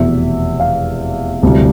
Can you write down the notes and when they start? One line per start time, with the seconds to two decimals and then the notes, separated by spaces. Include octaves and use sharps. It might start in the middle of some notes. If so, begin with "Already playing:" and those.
Already playing: F1 E2 B2 E5
0.60 F5
1.43 E1 D2 C3 E3 G3